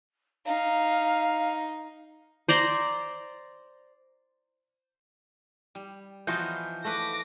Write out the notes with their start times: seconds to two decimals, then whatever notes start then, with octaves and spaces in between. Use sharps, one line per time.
0.46 D#4 F5
2.48 C5 D5 A#5 C6
5.75 G3
6.27 E3 F3 B3 D#4 F4 F#4 G6
6.85 A3 B4 D6 A#6